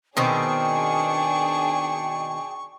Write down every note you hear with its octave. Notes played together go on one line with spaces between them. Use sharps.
B2 D#3 C4 D4 G#4 G5 C#6